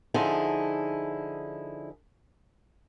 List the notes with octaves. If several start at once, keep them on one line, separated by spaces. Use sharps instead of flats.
D3 F3 D#4 E4 G#4